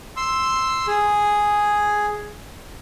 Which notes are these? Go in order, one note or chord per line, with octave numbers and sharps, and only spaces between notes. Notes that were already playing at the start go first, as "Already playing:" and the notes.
C6 E6
G#4